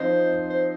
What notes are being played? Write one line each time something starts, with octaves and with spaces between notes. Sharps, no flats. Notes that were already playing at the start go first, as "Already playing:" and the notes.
Already playing: F3 C4 D#4 C5
C5